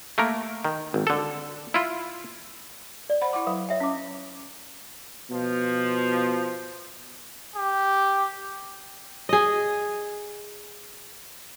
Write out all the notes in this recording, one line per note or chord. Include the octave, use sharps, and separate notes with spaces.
A3 A#3 A#4
D#3
G#1
D3 A4
E4 F4
D5
C5 F#5 B5
E4 F#5 C6 D6
F#3 B4 F5
C#5 D#5 E5 G5
C#4 F#5 D6
B2 F3
G4
G#4 D#5